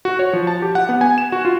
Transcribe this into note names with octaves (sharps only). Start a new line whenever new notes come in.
F#4
C#5
F3
A5
G4
F#5
B3
G#5
E7
F#4
F4